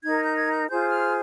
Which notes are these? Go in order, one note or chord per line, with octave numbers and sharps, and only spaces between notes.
D#4 A#4 G#6
G6
G#6
G6
F4 G#4 C5 G6
F6